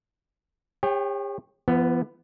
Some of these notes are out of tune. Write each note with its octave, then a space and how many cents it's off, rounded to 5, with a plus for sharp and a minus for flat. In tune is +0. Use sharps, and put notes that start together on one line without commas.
G4 +45 C#5 -25 G5 +0
F3 -45 B3 +0